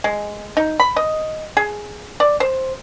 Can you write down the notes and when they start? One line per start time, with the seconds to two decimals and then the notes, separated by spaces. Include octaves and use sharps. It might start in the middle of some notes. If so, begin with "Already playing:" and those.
0.04 G#3
0.57 D#4
0.80 B5
0.96 D#5
1.57 G#4
2.20 D5
2.40 C5